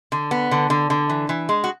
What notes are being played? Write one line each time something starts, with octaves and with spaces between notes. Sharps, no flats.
D3
B3
D3
D3
D3
E3
E3
G#3
F#4